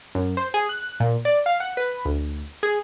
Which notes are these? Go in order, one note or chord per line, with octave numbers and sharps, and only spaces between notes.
F#2
C5
G#4
F#6
A#2
D5
F5
F#5
B4
D2
G#4